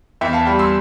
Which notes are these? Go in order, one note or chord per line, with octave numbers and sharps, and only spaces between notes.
E2 E5 G5
F5 A5
G3 G5 B5
C6 E6